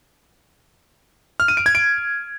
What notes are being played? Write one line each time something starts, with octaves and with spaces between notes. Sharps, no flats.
F6
D#7
D7
G#6
D7